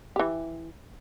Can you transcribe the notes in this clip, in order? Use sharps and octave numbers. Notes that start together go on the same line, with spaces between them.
E3 G4